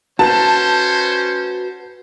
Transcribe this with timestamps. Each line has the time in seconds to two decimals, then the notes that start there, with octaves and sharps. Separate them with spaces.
0.19 A3 C#4 F#4 B4 C5 A5